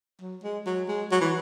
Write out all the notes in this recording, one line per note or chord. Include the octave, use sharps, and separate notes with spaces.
F#3
G#3
F#3
G#3
F#3
E3